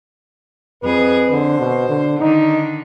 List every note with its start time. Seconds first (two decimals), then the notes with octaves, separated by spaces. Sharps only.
0.83 F2 G#4 B4
1.30 D3 C5
1.60 B2
1.89 D3
2.20 D3 D#3 D#4